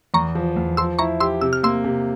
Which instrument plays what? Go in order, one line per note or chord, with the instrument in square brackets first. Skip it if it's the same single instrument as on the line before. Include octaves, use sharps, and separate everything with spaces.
[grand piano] E2 [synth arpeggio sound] A#5 C#6
[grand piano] F3
E2
[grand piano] F3 [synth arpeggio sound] C6 E6
[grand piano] E4 [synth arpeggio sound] A#5 C#6
[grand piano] G4 [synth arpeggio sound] C6 E6
[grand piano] C3 [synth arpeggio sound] E6
[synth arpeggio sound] F6
[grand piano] A#3 [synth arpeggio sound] C6 E6
[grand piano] C3